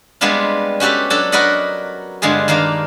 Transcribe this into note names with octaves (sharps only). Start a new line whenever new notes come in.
G3 G#3 B3 C4 D4 F4
C#4 F#4 G4 A4 B4
F#3 D4 A4
F#4 A#4 B4 D5 D#5 F#5
G2 D3 G#3 B3 F4 G#4
D#3 A#3 D4 F5